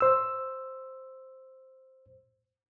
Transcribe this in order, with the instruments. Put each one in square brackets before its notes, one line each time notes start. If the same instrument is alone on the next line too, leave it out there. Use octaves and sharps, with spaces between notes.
[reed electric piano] C5 E6